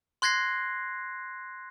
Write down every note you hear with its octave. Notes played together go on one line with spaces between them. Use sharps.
C6 F#6 G#6 A#6 C7